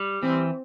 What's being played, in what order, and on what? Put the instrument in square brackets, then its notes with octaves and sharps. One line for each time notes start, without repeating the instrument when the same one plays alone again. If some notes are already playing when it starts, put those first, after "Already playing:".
Already playing: [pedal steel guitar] G3
[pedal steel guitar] E3 [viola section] C4